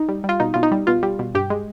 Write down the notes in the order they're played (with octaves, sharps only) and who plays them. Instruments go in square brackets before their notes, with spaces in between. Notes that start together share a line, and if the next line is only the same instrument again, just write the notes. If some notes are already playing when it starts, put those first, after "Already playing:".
Already playing: [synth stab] D#4
G3
G3
F4
B2 D#4
B2 F4
D#4
G3
B2 F4
G3
B2
G2 G4
G#3